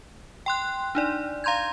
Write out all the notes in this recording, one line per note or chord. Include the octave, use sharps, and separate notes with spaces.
G5 C6 F#6
D4 D#4 D5
F5 A#5 C6 G6 G#6